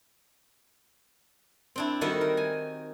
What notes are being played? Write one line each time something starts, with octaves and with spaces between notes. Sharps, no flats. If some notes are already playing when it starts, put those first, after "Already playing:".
C4 D4 E4
D#3 G3 F#4 A4 E5
A#4
G#5